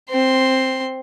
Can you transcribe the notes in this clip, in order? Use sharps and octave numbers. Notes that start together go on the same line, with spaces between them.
C4 C6